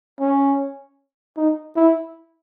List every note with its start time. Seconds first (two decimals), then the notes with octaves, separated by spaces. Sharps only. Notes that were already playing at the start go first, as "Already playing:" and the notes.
0.20 C#4
1.37 D#4
1.76 E4